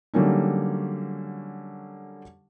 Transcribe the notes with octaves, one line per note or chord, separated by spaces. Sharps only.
D3 F#3 G3 A#3 C#4 D#4